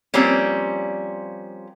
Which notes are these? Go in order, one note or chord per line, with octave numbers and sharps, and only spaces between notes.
F3 G3 A#3 C4 C#4